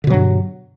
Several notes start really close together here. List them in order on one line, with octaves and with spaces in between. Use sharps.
D3 B2 F#3 G2